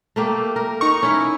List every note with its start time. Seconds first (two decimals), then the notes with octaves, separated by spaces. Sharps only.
0.16 A3 A#3 G4
0.56 A#4
0.81 D#4 A#5 C#6
1.03 C#4 E4